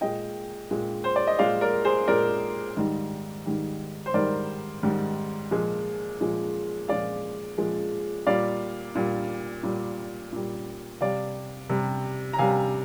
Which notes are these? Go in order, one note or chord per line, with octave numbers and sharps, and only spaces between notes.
A#2 G#3 D#5 G5
A#2 G#3
C5
D5
D#5
A#2 G#3 D5 F5
A#4 D5
G#4 C5
A#2 G#3 A#4 D5
G#2 D#3 G3
G#2 D#3 G3
C5
G#2 D#3 G3 A#4 D5
G#2 D#3 G3
A#2 F3 G#3
A#2 F3 G#3
A#2 F3 G#3 D5 F5
A#2 F3 G#3
A#2 G3 D5 F5
A#2 G3
A#2 G3
A#2 G3
C3 G3 D5 F5
C3 G3
A#5
C3 G3 F5 G#5